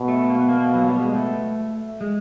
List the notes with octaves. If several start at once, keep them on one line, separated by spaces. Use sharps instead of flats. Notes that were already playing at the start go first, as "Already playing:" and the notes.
Already playing: B2
A3
A#3
B3
A#3
F#3
G3
G#3
A3
G#3